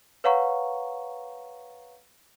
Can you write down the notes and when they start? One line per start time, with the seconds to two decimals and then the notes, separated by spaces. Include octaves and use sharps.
0.24 B4 C#5 F5 F#5 A#5 C#6